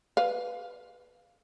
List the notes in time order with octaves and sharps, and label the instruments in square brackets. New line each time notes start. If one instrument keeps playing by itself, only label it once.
[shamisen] B4 F5